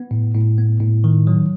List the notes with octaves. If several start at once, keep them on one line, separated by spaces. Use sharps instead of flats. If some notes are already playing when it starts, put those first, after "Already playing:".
Already playing: B3
A2
A2
B3
A2
D#3
F#3